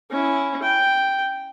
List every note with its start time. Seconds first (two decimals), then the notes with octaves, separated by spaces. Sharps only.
0.11 C#4 E4
0.63 G5